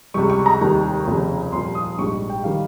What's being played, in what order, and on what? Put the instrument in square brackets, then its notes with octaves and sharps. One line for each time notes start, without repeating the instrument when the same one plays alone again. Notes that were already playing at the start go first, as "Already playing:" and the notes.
[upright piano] C#2 C3 G3 C#6
C#6
A#5
F1 D#2 D#3 G3
F1 D#2 C#3 F3
C2 A#2 F3 C6
D#6
A#1 G#2 G3 C#6
G5
D#3 G3 F5